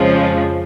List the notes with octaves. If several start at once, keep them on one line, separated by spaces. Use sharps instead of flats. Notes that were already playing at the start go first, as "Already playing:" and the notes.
Already playing: F2 C#3 F3 G#3